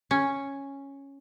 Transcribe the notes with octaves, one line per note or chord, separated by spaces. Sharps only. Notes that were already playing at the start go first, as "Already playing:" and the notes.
C#4